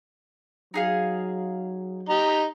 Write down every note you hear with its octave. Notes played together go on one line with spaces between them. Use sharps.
F#3 D#4 G#4 F5
D#4 G4 A#5